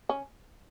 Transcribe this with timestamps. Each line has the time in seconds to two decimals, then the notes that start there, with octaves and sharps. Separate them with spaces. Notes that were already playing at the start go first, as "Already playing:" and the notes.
0.09 C#4